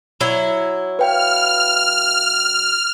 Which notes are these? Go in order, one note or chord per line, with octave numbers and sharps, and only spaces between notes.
F#3 E4
B4 F5 G5 F6